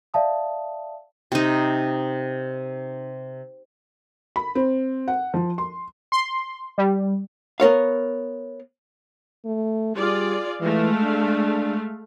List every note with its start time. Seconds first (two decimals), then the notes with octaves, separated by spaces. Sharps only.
0.14 D5 E5 F5 A5 D#6
1.32 C3 D#4
4.36 B5
4.55 C4
5.08 F#5
5.34 F3
5.58 C6
6.12 C6
6.78 G3
7.60 B3 A#4 C#5 F5
9.45 A3
9.96 G3 F4 G#4 D5
10.61 E3 G#3 A3 F5
11.03 D4